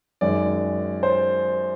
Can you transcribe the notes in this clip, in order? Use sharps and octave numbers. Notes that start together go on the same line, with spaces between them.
F#2 D#3 G#3 D5
C5